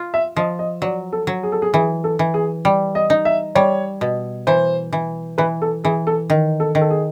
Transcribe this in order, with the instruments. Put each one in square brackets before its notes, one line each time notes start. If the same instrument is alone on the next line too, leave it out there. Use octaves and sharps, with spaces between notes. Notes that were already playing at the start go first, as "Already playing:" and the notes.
Already playing: [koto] F4
[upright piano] E5
[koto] F3 [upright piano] D#5
[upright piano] D#5
[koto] F#3 [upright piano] D5
[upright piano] A4
[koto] F#3
[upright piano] G#4
A4
G#4
[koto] E3 [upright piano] G#4
[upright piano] A4
[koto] E3
[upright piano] G#4
[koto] G3
[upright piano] D#5
[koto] D#4
[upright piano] E5
[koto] G3 [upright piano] C#5
[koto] B2
[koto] E3 [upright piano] C5
[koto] E3
[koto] E3 [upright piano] B4
[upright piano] A4
[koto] E3 [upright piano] G#4
[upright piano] A4
[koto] D#3
[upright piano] A4
[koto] D#3
[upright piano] A4
G#4